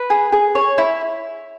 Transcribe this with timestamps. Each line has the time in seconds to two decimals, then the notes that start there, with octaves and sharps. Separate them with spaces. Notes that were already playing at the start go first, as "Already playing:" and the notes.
Already playing: B4
0.10 G#4
0.32 G#4
0.55 C#5
0.78 E4